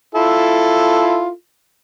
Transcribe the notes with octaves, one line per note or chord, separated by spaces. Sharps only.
E4 F4 A4